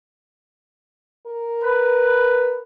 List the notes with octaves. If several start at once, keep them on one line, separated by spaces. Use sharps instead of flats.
A#4
B4